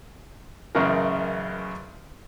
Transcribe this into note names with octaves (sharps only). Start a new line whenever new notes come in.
A1 F#2 C#3 A#4